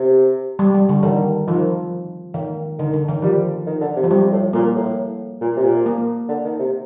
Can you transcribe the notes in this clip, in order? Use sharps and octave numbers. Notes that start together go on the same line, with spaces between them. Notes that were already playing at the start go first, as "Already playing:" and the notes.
Already playing: C3
G3
G3
D3
D3 D#3
D#3 F3
D#3
D3 D#3
D3
D#3
F3 G3
D#3
D3
C3
F3
C3 G3
A2
A#2 A#3
A2
A#2
C3
A#2
A#3
D3
D#3
C3